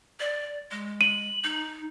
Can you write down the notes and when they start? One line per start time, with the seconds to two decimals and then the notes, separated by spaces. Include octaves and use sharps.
0.20 D5
0.71 G#3
1.01 D#7 F#7
1.44 D#4